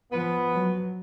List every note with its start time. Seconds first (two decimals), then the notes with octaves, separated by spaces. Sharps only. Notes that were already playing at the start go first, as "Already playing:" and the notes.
0.12 F3 B3
0.52 F#3